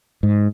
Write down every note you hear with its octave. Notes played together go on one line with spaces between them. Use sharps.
G#2